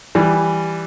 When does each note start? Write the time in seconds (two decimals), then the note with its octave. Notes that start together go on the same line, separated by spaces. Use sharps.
0.15 E3 G3